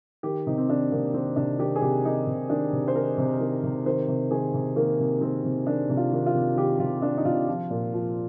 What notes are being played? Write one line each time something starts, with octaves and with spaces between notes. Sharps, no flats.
D#3 G4
C3 D#4
C4
D#3 D4
C3 A#3
D#3 C4
C3 D4
D#3 G4
G#4
C3 G4
D#3 D#4
C3
D#3 D4
C3
C5
D#3 A#4
C3
D#3
C3
D#3 C5
C3
D#3 G#4
C3
D#3 A#3
C3
D#3 C4
C3
D#3 D4
C3
F4
D#3
F4
C3
D#3 G4
C3 F4
D#3 D4
D#4
C3 F4
F3
A#2
F3